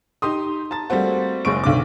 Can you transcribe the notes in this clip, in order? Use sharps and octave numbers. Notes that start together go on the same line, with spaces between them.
D#4 G4 C6 D#6
A5 A#5 A6
G3 A3 A#3 C4 F#4
F#1 G#3 C5 C#6 D7
B1 D3 D6